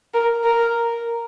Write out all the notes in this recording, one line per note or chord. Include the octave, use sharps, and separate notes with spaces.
A#4
A#4